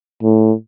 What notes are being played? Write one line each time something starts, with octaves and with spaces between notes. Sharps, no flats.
A2